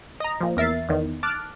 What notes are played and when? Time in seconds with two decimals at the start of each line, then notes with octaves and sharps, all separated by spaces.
0.20 D#5 A#5
0.41 A#2 F3
0.57 E2 A#4 E5 A6 C7
0.89 E2 D#3
1.23 A5 D6 F6 F#6